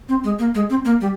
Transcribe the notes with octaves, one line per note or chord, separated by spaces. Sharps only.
C4
G#3
A#3
G#3
C4
A#3
G3